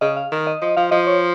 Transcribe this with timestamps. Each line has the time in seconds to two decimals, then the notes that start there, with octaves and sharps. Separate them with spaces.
0.01 C#3 D#5
0.17 F5
0.32 D#3
0.47 D#5
0.61 F3 D#5
0.77 F3 F5
0.91 F3 D#5
1.07 C#5